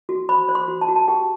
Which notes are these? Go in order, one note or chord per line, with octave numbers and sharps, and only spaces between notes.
F#4
C5 B5
C5
C6
F#4
A5
F#4
A5
G4 G5